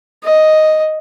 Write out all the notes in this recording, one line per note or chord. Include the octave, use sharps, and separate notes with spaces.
D#5